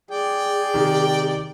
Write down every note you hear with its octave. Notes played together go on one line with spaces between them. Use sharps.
G#4 D5 G5
C3 D#3